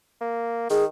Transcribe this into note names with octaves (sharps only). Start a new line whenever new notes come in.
A#3
D#3 G#4